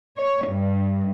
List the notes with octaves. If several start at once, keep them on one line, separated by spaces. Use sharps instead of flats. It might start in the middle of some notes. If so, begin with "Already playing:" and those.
C#5
G2